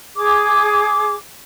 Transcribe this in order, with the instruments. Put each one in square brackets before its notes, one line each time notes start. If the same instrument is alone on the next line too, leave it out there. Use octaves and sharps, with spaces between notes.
[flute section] G#4 D6